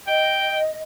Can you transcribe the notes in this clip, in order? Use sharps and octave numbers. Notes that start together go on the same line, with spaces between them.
D#5 G5